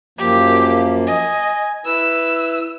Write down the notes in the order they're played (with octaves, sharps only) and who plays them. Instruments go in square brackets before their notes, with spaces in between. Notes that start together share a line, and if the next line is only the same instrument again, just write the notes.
[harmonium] F#2 F3 A#3 [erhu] G4
[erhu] D#5 [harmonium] G#5
[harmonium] E4 B4 [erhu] E6